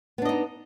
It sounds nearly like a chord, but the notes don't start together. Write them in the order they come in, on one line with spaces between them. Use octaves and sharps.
B3 D4 D#5 D#4